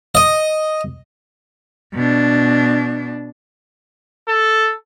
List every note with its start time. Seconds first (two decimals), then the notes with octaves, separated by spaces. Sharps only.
0.15 D#5
1.94 B2 D4
4.28 A4